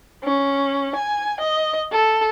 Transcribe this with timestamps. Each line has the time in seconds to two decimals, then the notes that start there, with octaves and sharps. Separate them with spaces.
0.24 C#4
0.95 G#5
1.40 D#5
1.92 A4